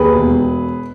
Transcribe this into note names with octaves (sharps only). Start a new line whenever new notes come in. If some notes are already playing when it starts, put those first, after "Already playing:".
Already playing: D#2 G#4 B4
E1